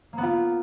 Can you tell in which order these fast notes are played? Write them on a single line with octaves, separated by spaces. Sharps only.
A#3 B3 F4